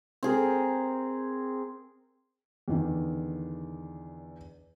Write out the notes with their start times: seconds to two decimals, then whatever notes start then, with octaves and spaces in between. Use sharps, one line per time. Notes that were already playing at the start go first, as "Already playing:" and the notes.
0.23 C4 G#4 A#4
2.68 E2 D3 D#3